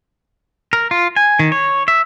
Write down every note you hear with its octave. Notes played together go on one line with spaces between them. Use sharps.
A#4
F4
G#5
D#3
C#5
E5